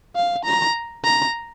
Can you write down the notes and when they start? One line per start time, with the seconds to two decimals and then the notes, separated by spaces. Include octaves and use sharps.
0.16 F5
0.45 A#5
1.04 A#5